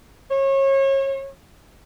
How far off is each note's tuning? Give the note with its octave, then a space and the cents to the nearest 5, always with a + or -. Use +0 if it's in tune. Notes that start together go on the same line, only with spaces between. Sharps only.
C#5 -30